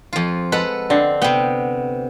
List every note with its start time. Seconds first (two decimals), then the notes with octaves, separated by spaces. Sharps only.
0.13 F2 F4
0.52 G#3 A4 B4 F#5
0.90 D3 C4
1.22 C3 B3 G5